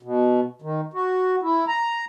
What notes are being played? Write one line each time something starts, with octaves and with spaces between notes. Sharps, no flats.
B2
D#3
F#4
E4
A#5